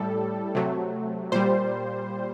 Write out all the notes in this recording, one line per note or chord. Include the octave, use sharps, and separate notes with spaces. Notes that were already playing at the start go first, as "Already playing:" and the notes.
Already playing: A2 G3 A4
C3 F#3 A3
A#2 G3 C5